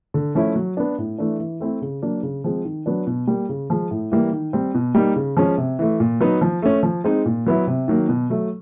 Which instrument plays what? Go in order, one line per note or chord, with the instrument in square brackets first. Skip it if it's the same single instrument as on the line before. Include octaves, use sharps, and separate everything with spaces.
[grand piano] D3
F3 A3 C#4 E4
F#3
B3 D4
A2
E3 A3 D4
E3
A3 C4 E4
C#3
F#3 A#3 D4
C#3
F3 G#3 C4
D#3
F#3 B3 D4
B2
G3 A#3
C#3
F3 G#3
A2
E3 G3 A#3
D#3
G3 C4
B2
G3 A#3 D#4
C#3
F3 G#3 C#4
C3
E3 A3
A#2
F#3 B3 D#4
F3
A3 C#4
F3
G#3 C4 D#4
A#2
F#3 B3 E4
C3
D#3 F#3 A#3
B2
F#3 A3